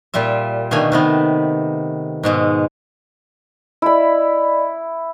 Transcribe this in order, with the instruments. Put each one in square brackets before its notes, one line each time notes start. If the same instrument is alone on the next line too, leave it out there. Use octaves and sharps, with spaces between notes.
[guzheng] A#2 G3 F4 E5
B2 D3 D#3 A3 A#3 G#5
C3 D#3 B3
G#2 B2 G#3
[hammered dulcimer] E4 B5 [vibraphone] D5 D#5